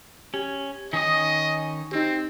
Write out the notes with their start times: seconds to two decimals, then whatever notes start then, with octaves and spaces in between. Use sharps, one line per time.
0.34 C#4 G4 G#6
0.93 D#3 C#4 D#5 G#5 D#6
1.92 C4 D#4 G4